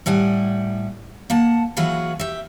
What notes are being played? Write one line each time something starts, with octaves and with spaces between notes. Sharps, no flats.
A2 G3 F#5 G#5
A#3 F#5 A5
E3 F#3 F4 F#4 G#4 B4
G4 E5